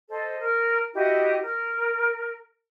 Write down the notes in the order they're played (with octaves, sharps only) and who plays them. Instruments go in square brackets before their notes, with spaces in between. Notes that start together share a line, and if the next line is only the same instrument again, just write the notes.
[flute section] A4 C5 D#5
A#4
E4 F#4 G4 D#5
A#4